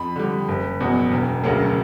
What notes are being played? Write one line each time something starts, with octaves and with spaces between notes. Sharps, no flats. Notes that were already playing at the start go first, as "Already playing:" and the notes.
Already playing: F2 B5
D3 G3
F#1
E2 B2 F#3
E1
D2 C#3 F#3 A#3